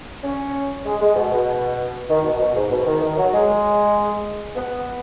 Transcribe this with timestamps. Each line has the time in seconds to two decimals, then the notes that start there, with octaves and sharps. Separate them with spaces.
0.23 C#4
0.85 G#3
1.00 G#3
1.16 B2
1.31 B2
2.09 D#3
2.24 B2
2.40 B2
2.55 G#2
2.71 B2
2.86 D#3
3.01 D#3
3.17 F#3
3.33 G#3
4.56 B3